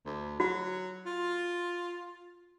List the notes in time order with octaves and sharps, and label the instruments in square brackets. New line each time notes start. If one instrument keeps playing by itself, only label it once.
[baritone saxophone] D2
[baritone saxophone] F#3 [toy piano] F#4
[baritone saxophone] F4